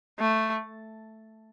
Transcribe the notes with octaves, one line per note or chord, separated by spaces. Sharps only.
A3